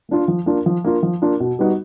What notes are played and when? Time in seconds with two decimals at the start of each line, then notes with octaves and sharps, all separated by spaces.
0.09 A#3 D4 F4
0.28 F3
0.46 A#3 D4 F4
0.66 F3
0.84 A#3 D4 F4
1.03 F3
1.22 A#3 D4 F4
1.40 B2
1.59 G3 B3 D#4 F#4